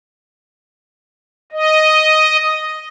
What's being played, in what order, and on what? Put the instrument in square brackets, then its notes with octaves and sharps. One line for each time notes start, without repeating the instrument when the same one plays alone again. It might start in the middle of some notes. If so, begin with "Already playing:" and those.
[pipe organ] D#5